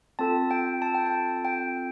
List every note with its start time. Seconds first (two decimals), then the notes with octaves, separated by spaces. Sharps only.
0.19 C4 F4 A4 A5
0.51 G5
0.82 A5
0.94 G5
1.06 A5
1.45 G5